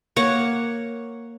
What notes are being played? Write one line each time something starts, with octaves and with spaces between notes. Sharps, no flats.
A#3 C#5 F#5